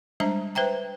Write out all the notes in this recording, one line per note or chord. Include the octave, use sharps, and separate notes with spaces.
G3 G#3 D4 C5 E5 A#5
B4 C5 E5 G5 A#5